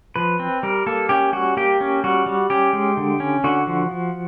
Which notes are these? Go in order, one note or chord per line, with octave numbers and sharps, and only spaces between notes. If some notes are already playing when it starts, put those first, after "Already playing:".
F3 B4
C4
G3 A#4
A#3 A4
C#4 G4
G3 F#4
A#3 G4
C#4
G3 F#4
G3
C#4 G4
G#3
D3
C#4
D3 F#4
F3
F3